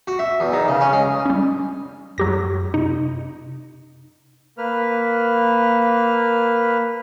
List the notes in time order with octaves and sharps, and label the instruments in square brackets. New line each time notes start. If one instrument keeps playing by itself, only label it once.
[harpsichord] F#4
E5
E2
D#3
C#3
C#4
G#3
[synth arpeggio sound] G3 C#4
[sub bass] F#2 [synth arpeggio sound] F#3 G4 A#6
[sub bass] C3 [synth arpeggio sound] D#4
[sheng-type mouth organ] A#3 B4 F6